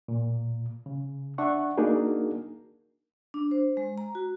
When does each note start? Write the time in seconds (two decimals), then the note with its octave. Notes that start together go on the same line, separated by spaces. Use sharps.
0.08 A#2
0.86 C#3
1.38 D4 E5 F#5 C#6
1.77 A#3 D4 D#4 F#4 G#4 A#4
3.34 D4
3.51 C5
3.77 G#3
3.98 A#5
4.15 F#4